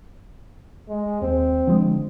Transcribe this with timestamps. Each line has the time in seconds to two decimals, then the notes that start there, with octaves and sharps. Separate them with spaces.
0.89 G#3
1.22 D#2 C4
1.67 D3 F3 G#3